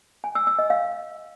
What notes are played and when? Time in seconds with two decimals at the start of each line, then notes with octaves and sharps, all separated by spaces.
0.24 G#5
0.35 E6
0.47 E6
0.59 D#5
0.70 F5